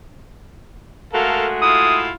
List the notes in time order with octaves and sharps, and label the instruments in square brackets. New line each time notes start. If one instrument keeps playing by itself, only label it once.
[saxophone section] G#3 A3 F#4 [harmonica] A4 A#4 F5
[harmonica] E4 F4 [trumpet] D#6